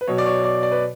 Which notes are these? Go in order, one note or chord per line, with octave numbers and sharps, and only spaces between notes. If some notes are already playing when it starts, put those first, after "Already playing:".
B4
B2 F#3 C#5
D5
C#5
D5
D5
B4